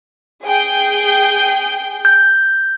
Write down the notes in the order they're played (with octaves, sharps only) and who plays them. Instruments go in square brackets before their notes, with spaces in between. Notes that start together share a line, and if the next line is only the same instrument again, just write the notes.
[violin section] G#4 G5 G6
[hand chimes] G6